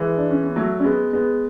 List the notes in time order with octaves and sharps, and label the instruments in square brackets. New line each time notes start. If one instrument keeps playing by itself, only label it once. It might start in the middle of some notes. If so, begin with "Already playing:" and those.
Already playing: [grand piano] E3 G#3
D4
C#4
B3
F#3 A3
C#4
G#3 B3
G#3 B3